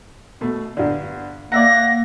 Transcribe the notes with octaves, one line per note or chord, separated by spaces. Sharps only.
B2 A3
G2 D3
A#3 D5 E5 F#5 A#6